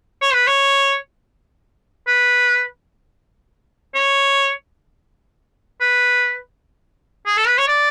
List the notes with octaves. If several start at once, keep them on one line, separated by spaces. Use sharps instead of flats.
C#5
B4
C#5
B4
C#5
B4
G#4
A4
B4
C#5
D5